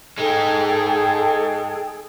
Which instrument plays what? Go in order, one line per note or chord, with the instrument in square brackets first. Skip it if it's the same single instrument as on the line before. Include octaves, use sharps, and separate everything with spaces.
[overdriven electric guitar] G#3 D#4 [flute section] G#4 A4 G5